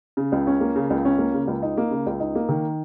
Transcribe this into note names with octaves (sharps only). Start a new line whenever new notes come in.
C#3
C#2
C#4
A#3
C#3
C#2
C#4
A#3
C#3
C#2
D#4
A#3
C#3
C#2
D#4
A#3
D#3